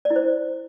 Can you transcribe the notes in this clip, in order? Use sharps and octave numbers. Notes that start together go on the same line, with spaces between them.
D5
E4
C5